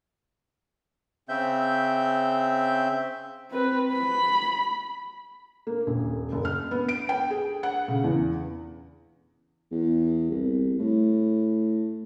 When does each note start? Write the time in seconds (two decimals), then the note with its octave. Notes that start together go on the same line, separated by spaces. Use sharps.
1.29 C#3 C4 E5 G6
3.51 C4 B4
3.92 B5
5.67 A#3
5.87 D#1
6.32 F#1
6.45 F6
6.71 B3
6.89 D7
7.09 G5
7.30 G#4
7.63 F#5
7.88 C#3
8.04 E2
9.71 E2
10.30 C2
10.79 A2